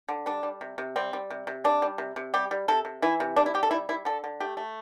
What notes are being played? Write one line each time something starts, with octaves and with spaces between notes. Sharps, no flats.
D3
G3 D4
G3
C3
C3
G3 C4
G3
C3
C3
G3 D4
G3
C3
C3
G3 G4
G3
C3 A4
C3
E3 E4
C3
G3 D4
E4
C3 G4
A4
G3 E4
G3 E4
D3 A4
D3
A3 G4
A3